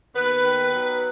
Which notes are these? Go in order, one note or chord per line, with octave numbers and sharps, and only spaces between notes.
D#2 B3 B4
D#3
F#3